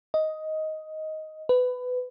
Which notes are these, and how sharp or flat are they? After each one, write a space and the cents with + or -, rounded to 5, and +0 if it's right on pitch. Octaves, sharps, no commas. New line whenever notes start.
D#5 +10
B4 +20